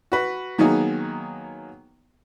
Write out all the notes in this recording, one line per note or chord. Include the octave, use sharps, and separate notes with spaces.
F#4 B4
D#3 F#3 A#3 B3 D#4 G#4